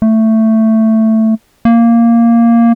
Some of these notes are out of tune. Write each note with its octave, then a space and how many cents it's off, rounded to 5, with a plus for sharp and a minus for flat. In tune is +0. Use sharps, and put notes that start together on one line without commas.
A3 +10
A#3 -5